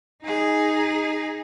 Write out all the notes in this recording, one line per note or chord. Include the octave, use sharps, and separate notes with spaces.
D#4 G#4